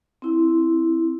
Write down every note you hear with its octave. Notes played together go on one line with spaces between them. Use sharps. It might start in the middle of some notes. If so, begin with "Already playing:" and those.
C4 E4